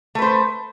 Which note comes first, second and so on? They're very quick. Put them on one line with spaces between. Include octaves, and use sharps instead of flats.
A3 B4 C5